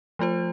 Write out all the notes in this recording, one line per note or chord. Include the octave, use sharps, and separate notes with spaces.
F3 A3 F4 C5